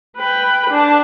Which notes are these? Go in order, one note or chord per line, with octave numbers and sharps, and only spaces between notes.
B4 G5
D4 A5